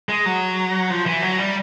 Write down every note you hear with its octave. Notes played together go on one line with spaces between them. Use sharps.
G#3
F#3
F3
E3
F#3
G3